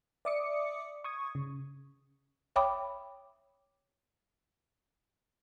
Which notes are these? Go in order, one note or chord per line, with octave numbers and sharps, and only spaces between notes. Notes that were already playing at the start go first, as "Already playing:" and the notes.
D5 E5 D6 D#6 C#7
C#6 D#6 G#6
C#3
C#5 E5 G5 B5 D6 D#6